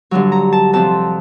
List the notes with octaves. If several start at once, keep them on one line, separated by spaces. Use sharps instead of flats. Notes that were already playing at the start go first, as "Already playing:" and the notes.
G2 D3 F#3
A#5
A5
F2 C3 F3 A5